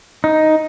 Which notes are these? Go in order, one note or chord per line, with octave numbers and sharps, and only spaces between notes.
D#4